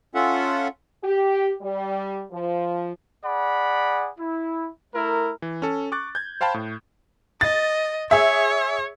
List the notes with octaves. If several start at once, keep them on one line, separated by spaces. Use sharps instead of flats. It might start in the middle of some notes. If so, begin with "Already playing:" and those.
C#4 F4 A4 E5 F#5
G4
G3
F3
G#4 D5 F#5 B5
E4
A3 E4 A#4
E3
C#4 A4
C#6 D6 F#6 A6
G6 G#6
C5 F5 G5 A5 B5
A2
D#5 A6
G#4 C#5 E5